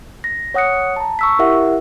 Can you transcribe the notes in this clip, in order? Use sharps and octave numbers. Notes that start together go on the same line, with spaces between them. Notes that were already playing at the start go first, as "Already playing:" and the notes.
A#6
C#5 F#5 D#6 F#6 C#7
A5 A#5
C#6 E6 B6
E4 G4 A#4 E5 F#5